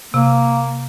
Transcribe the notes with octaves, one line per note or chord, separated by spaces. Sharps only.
C3 A#3